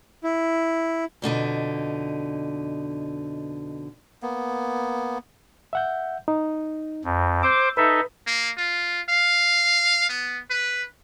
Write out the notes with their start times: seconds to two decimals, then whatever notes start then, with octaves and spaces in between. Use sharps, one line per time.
0.24 E4
1.22 F2 B2 D3 D#4
4.22 A#3 B3
5.73 E5 F#5 G6
6.28 D#4
7.04 F2
7.43 C5 D6 E6 G6
7.77 D#4 A4 B4 E5
8.27 A#3
8.58 F4
9.09 F5
10.09 B3
10.50 B4